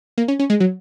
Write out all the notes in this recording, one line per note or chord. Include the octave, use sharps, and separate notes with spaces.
A#3
C#4
C#4
G#3
F#3